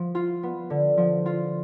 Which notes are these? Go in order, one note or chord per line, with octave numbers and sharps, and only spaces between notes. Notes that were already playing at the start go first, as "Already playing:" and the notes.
Already playing: F3
F4
B3
D3
F3
F4